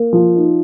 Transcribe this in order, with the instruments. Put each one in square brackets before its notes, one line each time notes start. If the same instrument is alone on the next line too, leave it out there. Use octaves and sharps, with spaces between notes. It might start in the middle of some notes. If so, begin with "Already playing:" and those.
Already playing: [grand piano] A#3
F3
D#4